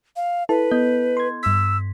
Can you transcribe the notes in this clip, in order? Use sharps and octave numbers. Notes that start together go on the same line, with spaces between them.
F5
E4 A4 B4 A5
B3 D#5 G6
C6 G#6
G2 E6 B6